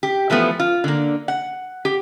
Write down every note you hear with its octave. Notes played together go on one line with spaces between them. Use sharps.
G4
E3 F3 A3 B3
F4
D3 A#3
F#5
G4